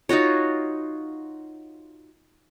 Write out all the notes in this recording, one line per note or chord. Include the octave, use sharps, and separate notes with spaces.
D#4 F4 F#4 C#5